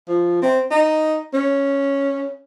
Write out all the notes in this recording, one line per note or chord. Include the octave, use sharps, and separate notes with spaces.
F3
C4
D#4
C#4